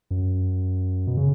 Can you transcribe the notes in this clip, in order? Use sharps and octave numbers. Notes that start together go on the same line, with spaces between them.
F#2
B2
C#3